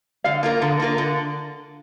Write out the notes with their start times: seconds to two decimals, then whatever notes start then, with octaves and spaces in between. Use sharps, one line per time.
0.24 D3 F5
0.43 A#3 F4 A#4
0.62 D3
0.80 A#3 F4 A#4
0.98 D3